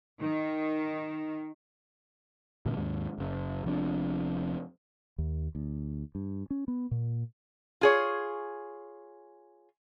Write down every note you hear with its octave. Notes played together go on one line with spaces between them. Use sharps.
D#3
A1 G2 A#2 D3
D#2 G#2
F#1 F#2
F1 F2 D4
D#2
D2
G2
C#4
B3
A#2
F4 G#4 C#5